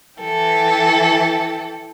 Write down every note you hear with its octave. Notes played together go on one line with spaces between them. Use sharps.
E3 A4 G5